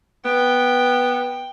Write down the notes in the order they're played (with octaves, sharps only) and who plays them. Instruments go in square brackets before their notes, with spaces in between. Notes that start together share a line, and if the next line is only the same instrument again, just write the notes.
[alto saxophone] B3 [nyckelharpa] G5